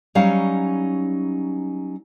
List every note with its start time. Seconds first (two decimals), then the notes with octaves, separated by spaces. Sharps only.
0.15 F#3 G3 C#4 D#4 F5